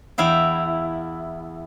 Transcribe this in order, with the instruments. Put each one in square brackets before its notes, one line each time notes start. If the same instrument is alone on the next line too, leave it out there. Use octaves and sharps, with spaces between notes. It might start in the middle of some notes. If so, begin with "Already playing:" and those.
[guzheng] E2 E4 F5 G5